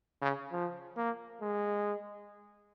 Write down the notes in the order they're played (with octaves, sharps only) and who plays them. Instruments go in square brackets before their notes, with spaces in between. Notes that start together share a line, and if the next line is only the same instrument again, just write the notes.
[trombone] C#3
F3
A#3
G#3